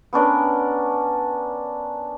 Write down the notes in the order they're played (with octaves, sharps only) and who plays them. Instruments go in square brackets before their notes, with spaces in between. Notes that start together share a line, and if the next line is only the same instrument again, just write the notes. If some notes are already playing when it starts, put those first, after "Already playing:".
[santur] B3 C#4 D4 A#4